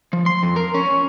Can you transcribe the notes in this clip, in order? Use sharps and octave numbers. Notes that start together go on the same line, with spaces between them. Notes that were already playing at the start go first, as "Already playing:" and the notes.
F3
C6
F2
A#4
C#4